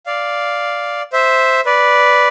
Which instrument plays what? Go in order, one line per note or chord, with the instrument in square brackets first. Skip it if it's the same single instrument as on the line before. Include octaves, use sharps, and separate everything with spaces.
[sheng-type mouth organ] D5 F5
C5 E5
B4 D5